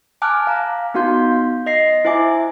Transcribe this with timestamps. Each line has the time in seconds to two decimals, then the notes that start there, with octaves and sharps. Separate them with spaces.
0.22 G#5 A5 D6 F6 F#6
0.47 F5 A#5
0.94 B3 D#4 F#4 F5 C6 G6
1.66 D#5 A#6 C7
2.05 E4 C5 E5 G#5 D6